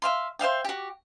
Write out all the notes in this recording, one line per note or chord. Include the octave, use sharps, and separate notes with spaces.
E5 F5 C6
C5 E5 F5 G5
F#4 G4